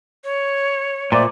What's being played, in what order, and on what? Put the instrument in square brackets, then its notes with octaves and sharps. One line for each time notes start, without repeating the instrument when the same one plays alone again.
[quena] C#5
[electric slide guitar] A#2 [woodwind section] F3 A3 D5